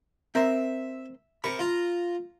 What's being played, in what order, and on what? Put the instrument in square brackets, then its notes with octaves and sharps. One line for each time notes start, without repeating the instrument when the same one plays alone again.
[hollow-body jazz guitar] C4 A#4 C5 [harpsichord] E5
[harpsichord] C3 A#4 C#6 [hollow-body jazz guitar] B5
[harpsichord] F4 A#5